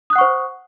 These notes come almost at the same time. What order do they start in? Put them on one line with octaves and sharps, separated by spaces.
D#6 F#6 F#5 C#6 C5